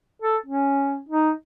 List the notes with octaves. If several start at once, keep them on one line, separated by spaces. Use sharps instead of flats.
A4
C#4
D#4